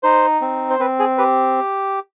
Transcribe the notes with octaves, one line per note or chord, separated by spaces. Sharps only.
D#4 C5
C4
C5
C4 B4
G#4
G4 B4